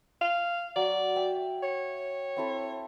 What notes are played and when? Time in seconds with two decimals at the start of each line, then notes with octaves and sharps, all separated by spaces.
0.21 F5
0.76 F#3 C#5 D5
1.16 E5 G5
1.63 C#5
2.37 C4 E4 A4